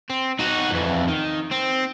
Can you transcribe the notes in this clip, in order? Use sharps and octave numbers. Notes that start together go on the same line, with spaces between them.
C4
D#4 F#4
F2 E3
D#3
C4